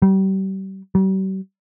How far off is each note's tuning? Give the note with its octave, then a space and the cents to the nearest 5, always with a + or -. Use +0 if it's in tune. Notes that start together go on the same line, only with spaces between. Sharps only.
G3 -35
G3 -45